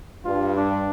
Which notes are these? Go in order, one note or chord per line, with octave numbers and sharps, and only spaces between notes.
G2 F4
D4